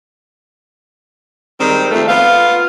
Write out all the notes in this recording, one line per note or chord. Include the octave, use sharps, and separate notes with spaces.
D#3 G3 G#3 C4
F2 A3
B3 F4 F5